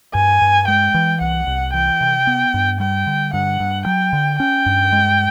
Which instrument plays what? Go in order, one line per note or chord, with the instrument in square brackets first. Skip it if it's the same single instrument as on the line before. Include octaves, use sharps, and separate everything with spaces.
[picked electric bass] G2 [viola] G#5
[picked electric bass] G2
[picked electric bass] G#3 [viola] G5
[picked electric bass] E3
[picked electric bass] C2 [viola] F#5
[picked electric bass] C2
[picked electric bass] E3 [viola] G5
[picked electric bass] C3
B3
G2
[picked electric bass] G3 [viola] G5
[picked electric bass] D3
[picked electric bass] G2 [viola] F#5
[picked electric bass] G2
[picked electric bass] F#3 [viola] G5
[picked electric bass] D3
[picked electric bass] C#4 [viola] G5
[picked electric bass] G2
G#3